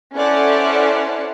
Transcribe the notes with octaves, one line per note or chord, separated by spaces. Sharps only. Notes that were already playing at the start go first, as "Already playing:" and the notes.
C#4 E4 A4 C5 D5 F#5